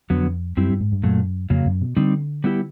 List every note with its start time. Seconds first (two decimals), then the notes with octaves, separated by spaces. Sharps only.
0.10 F2 D3 F#3 B3
0.57 F#2 G3 C4 E4 G4
0.69 G2
0.80 G#2
0.92 G2
1.03 F#2 A#2 F#3 A3
1.50 F2 C#3 F#3 A#3
1.66 F#2
1.81 B2
1.97 D3 G3 C4 D#4
2.44 G3 B3 E4 G4